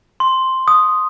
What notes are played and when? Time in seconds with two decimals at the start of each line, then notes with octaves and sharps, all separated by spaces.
0.20 C6
0.68 D#6